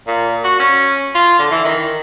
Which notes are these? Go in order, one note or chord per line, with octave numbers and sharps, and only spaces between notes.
A#2
F#4
C#4
F4
D3
E3
D#3